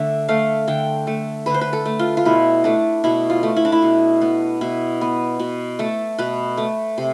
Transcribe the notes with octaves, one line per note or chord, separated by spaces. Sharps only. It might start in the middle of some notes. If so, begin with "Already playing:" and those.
Already playing: D3 A3 E5
A3 F5
D3 G5
A3
D3 B4
C5
B4
A4
A3
F4
F4
B2 E4
A3 D4
B2 E4
F4
A3
E4
D4
E4
B2
B3
B2 E4
B3
B2
A3 A4
B2 B4
A3
C3